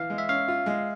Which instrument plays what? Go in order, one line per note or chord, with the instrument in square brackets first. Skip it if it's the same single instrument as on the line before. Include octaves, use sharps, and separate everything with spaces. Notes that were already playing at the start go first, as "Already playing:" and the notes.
Already playing: [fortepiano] E3 [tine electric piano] F5
[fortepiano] G#3
[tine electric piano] E5
[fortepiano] C#4 [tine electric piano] F5
[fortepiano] F4
G#3